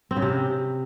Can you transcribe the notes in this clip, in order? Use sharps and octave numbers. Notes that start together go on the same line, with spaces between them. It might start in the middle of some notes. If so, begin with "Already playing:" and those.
C4
C#3
C3